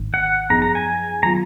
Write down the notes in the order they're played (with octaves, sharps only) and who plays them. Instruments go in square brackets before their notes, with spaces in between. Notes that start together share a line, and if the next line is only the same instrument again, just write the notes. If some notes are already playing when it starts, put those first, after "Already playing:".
Already playing: [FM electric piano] G#1 G#2 D#3
[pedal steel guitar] F#5
[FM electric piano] F#2 F3 B3 D#4 G#4 [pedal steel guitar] A#5
[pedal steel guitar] A#5
G#5
[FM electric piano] D#3 F#3 B3 F4 [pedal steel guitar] A#5